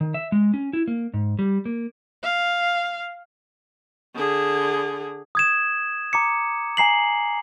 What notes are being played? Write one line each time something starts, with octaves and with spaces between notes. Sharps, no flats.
D#3
E5
G#3
C#4
E4
A#3
G#2
G3
A#3
F5
D3 G#4
D#6 G#6 E7
A#5 D6 C#7
G#5 A#5 C7 F#7